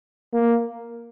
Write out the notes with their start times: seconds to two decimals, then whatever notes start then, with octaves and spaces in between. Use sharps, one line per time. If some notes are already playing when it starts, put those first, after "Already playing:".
0.34 A#3